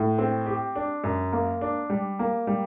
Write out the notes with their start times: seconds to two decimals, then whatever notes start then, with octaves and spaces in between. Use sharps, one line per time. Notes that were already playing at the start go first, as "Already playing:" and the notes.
Already playing: A2
0.18 C4
0.46 G4
0.76 D4
1.04 F#2
1.33 A#3
1.61 D4
1.90 G3
2.19 A#3
2.47 G3